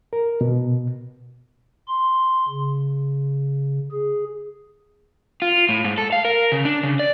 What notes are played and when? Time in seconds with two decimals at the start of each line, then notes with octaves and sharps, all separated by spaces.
0.13 A#4
0.41 B2
1.88 C6
2.48 C#3
3.92 G#4
5.42 F4
5.69 A2
5.85 G#2
5.98 A4
6.12 F5
6.25 A#4
6.52 C#3
6.65 D4
6.83 C#3
6.99 D5